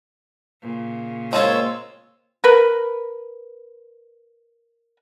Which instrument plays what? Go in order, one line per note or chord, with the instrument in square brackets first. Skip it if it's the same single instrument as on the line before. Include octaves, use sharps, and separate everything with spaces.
[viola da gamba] A#2 C#3
[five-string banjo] G#3 C4 F4 [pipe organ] A#3 E6 [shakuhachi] C#5
[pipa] A#4 B4